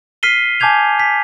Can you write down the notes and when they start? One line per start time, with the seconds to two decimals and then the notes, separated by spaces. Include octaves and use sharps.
0.23 F6 B6 C7 D#7 G7
0.60 G#5 A5 D6 G6 G#6 F7
1.00 B6